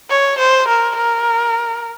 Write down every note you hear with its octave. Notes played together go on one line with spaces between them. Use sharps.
C#5
C5
A#4
A#4